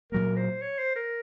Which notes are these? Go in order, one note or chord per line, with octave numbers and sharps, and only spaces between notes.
A#2 F#3 A#3 A#4
C5
C#5
C5
A#4